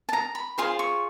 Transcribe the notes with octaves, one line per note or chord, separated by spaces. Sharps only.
A5
A#5
B5
F4 G#4 C5 C6
C#6